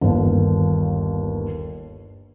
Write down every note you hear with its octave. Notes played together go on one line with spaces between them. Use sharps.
G1 D#2